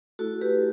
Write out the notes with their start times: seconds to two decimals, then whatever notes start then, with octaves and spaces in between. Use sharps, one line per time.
0.19 A3 E4 F#4 A4
0.41 G4 B4